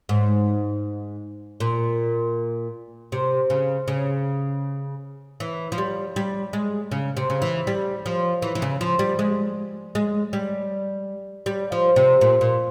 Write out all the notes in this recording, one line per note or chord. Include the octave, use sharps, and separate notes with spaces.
G#2
A#2
C3
C#3
C#3
E3
F3
G3
G3
G#3
C#3
C3
C#3
E3
G3
F3
E3
E3
C#3
F3
G3
G#3
G#3
G3
G3
F3
C3
A#2
A#2